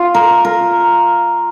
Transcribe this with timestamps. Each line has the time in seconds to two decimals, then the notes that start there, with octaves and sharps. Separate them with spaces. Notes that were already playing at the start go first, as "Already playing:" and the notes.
Already playing: F4
0.14 A#4
0.45 A#4